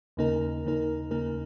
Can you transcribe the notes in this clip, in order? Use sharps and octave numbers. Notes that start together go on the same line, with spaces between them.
D#2 C#3 A#3 D#4 A#4
D#2 C#3 A#3 D#4 A#4
D#2 C#3 A#3 D#4 A#4